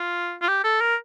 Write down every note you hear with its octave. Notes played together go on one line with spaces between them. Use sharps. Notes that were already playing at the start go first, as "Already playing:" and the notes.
Already playing: F4
F4
G4
A4
A#4